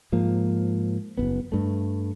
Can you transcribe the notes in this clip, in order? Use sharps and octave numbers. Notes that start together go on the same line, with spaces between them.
G#2 F3 A#3
F#1 F2 B3
G2 A3